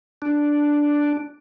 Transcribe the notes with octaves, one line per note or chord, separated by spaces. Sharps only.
D4